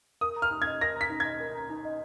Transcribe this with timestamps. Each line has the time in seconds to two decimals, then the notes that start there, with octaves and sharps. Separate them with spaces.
0.21 A#4 D#6
0.36 A#5
0.42 F6
0.51 D#4
0.62 G#6
0.67 D#5
0.81 A#4 A#6
0.96 A#5 B6
1.10 D#4
1.20 D#5 G#6
1.40 A#4
1.55 A#5
1.70 D#4
1.85 D#5